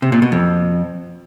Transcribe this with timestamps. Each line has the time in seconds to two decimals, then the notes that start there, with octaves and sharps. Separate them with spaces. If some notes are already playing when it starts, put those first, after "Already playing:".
0.02 C3
0.12 A#2
0.22 B2
0.32 F2